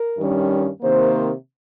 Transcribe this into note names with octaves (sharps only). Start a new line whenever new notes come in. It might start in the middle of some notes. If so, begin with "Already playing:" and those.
Already playing: A#4
G2 D#3 G3 C#4
C3 D#3 A#3 C5